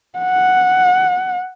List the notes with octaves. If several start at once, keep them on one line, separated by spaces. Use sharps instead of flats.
F#5